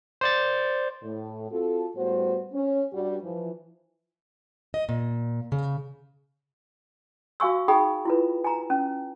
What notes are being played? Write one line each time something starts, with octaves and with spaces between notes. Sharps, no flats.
C5 D5 A6
A2
C4 F4 F#4 A4
A2 G3 B3 F#4 C5
C#4
G2 G3 F#4
E3 F3
D#5
A#2
C#3
F#4 F5 G#5 C#6 E6
D#4 G#4 G5 B5 D#6
E4 F4 B4
G#5 A#5
C#4